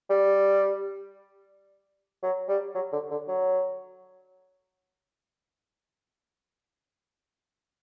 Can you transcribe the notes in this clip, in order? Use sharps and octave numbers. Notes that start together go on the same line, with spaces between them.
G3
F#3
G3
F#3
D3
D3
F#3